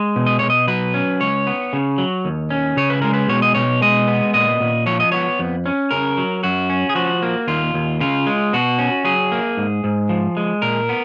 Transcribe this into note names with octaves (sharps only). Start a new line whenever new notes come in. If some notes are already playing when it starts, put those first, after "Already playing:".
Already playing: G#3
B2
D#5
B2 C#5
D#5
F#3 B4
C#4
C#2 C#5
B3
C#3
F#3
D#2
C#4
C#3 C#5
B4
G#3 A#4
B4
B2 C#5
D#5
B2 C#5
G#3 D#5
B3
A#2 D#5
A#2
F3 C#5
D#5
B3 C#5
F2
C#4
C#3 A#4
F#3
F#2 F#4
C#4
G#4
F3 F#4
A#3
D#2 F4
D#2
C#3 F4
G#3
B2 F#4
C#4
F#3 G#4
A#3
G#2
G#2
F3
G#3
A#2 A#4
B3